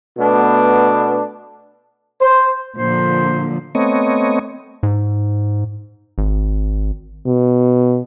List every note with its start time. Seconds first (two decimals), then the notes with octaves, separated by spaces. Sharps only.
0.18 B2 A3 B3 D4
2.21 C5
2.77 A#2 D3 F3 C5
3.75 A3 B3 C4 C#5 D#5
4.83 G#2
6.18 G#1
7.27 B2